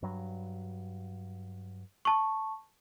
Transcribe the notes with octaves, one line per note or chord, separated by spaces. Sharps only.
G2 F#3
A5 C#6